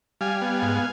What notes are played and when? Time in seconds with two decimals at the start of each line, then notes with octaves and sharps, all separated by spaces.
0.21 G3 F5 G#5
0.42 B3
0.62 G#2